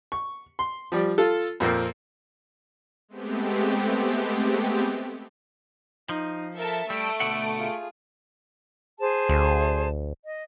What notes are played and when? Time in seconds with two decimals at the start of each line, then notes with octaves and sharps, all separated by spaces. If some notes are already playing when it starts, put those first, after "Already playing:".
0.12 C#6
0.59 C6
0.92 F3 G3 D5
1.18 F4 A4
1.60 F2 A#2 A#3 C4
3.08 G#3 A3 B3 C4 G4
6.09 F3 D#4
6.58 A4 A#4 E5 A5
6.90 G3 A3 E6 D7
7.20 B2 D3 F#5
7.58 F4 G#4
8.98 G#4 C5 A5
9.29 D2
10.23 D#5